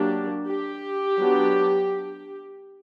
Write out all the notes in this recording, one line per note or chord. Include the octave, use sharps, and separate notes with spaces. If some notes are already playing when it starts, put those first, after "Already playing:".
Already playing: F#3 A#3 D4 G4
G4
F#3 B3 D4